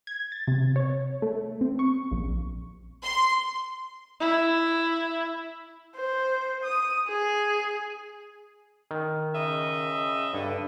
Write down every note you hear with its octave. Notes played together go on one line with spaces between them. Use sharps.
G#6
A6
C3
C#5
A3
C4
C#6
A#1
C6
E4
C5
D#6
G#4
D#3
C#3 D#5 E5
G2 D3